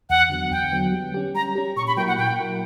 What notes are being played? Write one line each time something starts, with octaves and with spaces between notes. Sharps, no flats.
E2 F#5
D3 F#3 B3
E2 G5
D3 F#3 B3
G3
C#4 G4
G3 A#5
C#4 G4
A#2 C#6
B5
F#3 A#3 E4 A#4 G5
F#5
A#2 G5
F#3 A#3 E4 A#4